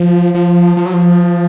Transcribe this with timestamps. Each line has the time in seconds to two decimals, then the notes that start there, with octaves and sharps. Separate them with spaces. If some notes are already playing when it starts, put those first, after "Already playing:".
Already playing: F3
0.35 F3
0.77 F3
0.86 F#3
0.94 F3